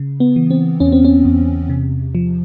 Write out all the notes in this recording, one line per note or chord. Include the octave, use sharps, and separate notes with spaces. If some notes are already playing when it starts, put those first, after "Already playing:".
Already playing: C#3
B3
E3
C4
E2 C#4
C4
C#4
E2
C3
F3